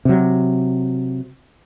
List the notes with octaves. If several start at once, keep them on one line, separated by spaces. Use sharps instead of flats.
C3 F#3